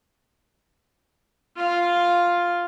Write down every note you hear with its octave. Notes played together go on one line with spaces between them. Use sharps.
F4 F5